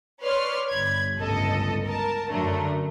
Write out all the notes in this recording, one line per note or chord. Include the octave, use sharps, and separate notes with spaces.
B4 C#5 D5 C6 F6
G1 B5 G#6
G1 C#2 A2 A4 D#5
A#4 A5
F#2 D3 A3 A#4